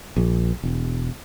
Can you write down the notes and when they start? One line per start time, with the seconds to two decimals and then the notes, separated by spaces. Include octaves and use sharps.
0.16 A#1
0.63 E1